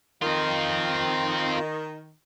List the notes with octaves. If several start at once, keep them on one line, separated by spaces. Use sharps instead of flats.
D#3 C4 F4